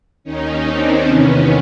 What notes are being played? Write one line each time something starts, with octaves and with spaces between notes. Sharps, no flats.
D#2 D#3 C#4 D#4
C4 D4
E2 C3 D#3 B3 C#4